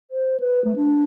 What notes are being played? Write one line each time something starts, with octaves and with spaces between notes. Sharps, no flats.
C5
B4
A3
D4